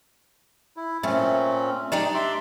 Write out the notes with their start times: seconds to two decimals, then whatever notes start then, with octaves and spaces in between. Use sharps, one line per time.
0.77 E4
1.03 A#2 A3 C4 C#4
1.92 D4 D#4 G4
2.14 E5 C6 D6